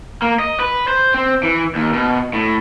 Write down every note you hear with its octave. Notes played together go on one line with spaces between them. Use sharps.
A#3
D#5
B4
C5
C4
E3
D#2
B2
A2